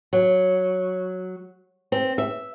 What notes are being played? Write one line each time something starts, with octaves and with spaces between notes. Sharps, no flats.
F#3
C4
E5